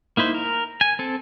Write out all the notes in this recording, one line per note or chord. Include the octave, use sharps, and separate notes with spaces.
A#3 D#4 E4 C5
A#4
G#5
C4 A4